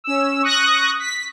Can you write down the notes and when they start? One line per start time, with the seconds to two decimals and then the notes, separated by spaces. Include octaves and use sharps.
0.04 C#4 E6
0.42 C#6 D#6 F#6 A#6
1.00 B6